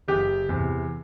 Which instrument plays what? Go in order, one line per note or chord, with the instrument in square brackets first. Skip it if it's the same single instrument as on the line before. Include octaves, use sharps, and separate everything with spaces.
[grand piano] F#1 [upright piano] G4
[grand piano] E2 C3